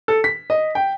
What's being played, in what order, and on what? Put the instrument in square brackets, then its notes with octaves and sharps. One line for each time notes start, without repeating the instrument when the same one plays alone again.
[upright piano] A4
B6
D#5
G5